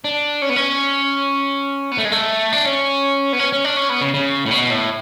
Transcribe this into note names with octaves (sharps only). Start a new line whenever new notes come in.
D4
C#4
B3
C#4
B3
A3
G#3
A3
D4
C#4
B3
C#4
C#4
D4
C#4
B3
C#3
C#3
A2
B2
A2